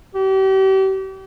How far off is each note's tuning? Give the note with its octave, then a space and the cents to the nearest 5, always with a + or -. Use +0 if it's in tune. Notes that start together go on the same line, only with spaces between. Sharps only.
G4 -35